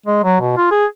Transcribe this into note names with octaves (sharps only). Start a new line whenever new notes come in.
G#3
F#3
B2
F4
G#4